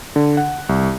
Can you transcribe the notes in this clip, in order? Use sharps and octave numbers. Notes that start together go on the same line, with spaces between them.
D3
F#5
C2